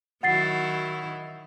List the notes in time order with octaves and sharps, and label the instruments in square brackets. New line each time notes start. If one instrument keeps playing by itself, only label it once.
[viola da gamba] D#3 F#3 E4 [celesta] F#5 A6 C7